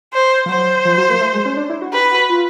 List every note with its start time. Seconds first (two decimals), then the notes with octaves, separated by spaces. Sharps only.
0.13 C5
0.46 F3
0.49 F#3 C5
0.85 F3
0.98 F#3
1.10 A#3
1.21 A3
1.33 G#3
1.45 C#4
1.57 D4
1.69 E4
1.82 F#4
1.93 G4 B4
2.11 F#4
2.29 F4